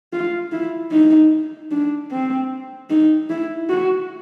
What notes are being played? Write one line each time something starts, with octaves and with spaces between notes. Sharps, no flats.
F4
E4
D#4
D4
C4
D#4
E4
F#4